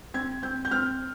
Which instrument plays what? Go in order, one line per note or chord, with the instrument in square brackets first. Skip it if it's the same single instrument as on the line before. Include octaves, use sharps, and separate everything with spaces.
[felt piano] C4 G#6
C4 G6
G6
C4 F6